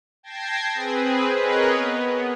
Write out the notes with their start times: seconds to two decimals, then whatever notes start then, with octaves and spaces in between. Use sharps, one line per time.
0.23 G5 A5 G#6 A#6 C7
0.74 C4 G#4 B4
1.34 G#4 A#4 B4 C#5 D#5
1.74 B3